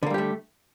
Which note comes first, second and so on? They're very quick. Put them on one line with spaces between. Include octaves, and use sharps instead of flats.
D3 A#3 G3 G4 A3